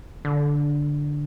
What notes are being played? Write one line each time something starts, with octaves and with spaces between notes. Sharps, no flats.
D3